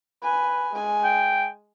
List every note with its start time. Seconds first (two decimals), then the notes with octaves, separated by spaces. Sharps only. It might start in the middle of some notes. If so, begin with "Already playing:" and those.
0.23 B4 G#5
0.73 G#3 G#5
1.04 G5